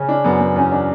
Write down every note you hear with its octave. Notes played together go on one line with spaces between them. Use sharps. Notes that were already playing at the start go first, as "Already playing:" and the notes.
Already playing: C#3 C#4
D4
F#2 B3
B3
E2 C#4
D4